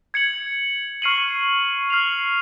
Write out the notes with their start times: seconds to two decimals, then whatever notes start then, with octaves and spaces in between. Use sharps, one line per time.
0.14 G#6 C#7 F#7
1.02 C#6 F6 C7 D#7 F#7
1.90 F6 C7 F7